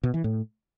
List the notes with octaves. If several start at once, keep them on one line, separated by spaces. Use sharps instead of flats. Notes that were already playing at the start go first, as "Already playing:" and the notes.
B2
E3
A2